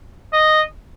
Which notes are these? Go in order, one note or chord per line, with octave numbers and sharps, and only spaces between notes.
D#5